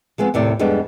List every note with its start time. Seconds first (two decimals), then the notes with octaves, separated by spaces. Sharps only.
0.18 F3 G#3 B3 C4
0.34 D#2 A2 C3 D5
0.59 F2 G3 G#3 B3 D4